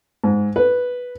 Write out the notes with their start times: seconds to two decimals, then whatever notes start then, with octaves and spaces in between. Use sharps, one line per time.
0.24 G#2
0.56 B4